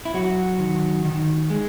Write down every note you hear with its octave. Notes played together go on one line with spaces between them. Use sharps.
E4
F#3 F#4
D#3
D#3
G#3